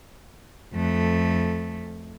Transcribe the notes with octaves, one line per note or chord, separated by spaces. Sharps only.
F2 A3